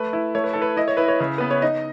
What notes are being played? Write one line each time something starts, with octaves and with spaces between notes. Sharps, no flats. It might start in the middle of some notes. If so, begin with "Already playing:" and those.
Already playing: A3 B4
E4
A3 C#5
B4
E4 A4
B4
E4 D#5
C#5
E4 B4
C#5
C#3
B3 B4
C#5
D#4 D#5